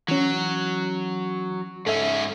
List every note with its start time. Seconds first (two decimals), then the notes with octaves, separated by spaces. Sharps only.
0.08 E3 F#3 C#4
1.86 G#2 C#4 A4 E5